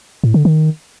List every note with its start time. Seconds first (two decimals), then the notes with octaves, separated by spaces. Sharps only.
0.24 A2
0.34 D3
0.45 D#3